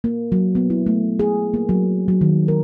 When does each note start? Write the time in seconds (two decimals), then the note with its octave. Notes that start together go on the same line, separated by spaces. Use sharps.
0.04 A#3
0.32 F#3
0.55 B3
0.70 E4
0.86 A3
1.19 G#4
1.54 A#3
1.69 F#3
2.08 F#3
2.21 D#3
2.48 A#4